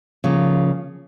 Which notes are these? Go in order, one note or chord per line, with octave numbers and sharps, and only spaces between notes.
C#3 F3 A#3